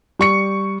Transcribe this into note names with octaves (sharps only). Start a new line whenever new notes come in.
G3 C#6 C#7